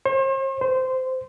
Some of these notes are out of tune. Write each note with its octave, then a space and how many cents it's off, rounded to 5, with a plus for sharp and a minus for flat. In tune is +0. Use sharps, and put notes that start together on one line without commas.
C5 +45
C5 -15